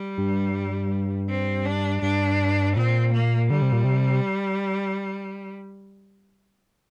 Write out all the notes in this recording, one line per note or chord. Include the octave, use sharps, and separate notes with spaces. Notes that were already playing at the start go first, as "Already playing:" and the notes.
Already playing: G3
G2
C4
D4
G2 D4
A#2 C4
A#3
D3 G3
C3
A#2
C3